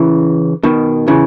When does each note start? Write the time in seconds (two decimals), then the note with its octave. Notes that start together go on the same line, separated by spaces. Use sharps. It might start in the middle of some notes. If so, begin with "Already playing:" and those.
Already playing: C#3 E3
0.63 B2 D#3
1.08 C#3 E3